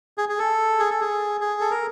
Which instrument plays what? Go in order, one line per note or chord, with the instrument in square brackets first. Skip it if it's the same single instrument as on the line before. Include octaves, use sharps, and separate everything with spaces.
[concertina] G#4
G#4
A4
G#4
A4
G#4
G#4
A4
A#4